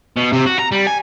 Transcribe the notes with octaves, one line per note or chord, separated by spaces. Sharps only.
B2
C3
F#4
A#5
G3
G#5